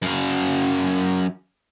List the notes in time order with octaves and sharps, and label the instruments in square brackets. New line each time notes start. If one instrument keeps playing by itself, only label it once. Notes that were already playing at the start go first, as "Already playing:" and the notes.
[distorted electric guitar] F#2 F5